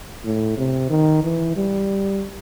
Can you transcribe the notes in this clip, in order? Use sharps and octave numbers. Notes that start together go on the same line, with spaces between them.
A2
C3
D#3
E3
G3